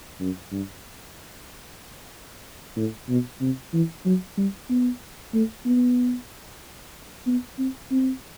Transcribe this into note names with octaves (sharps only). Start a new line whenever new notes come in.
F#2
G2
A2
B2
C3
E3
F#3
G3
B3
A3
B3
B3
C4
C4